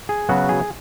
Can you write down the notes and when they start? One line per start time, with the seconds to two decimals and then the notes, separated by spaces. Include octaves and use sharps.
0.09 G#4
0.29 C#3 F#3 B3 F#4
0.49 G#4